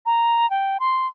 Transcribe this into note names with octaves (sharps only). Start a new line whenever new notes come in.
A#5
G5
C6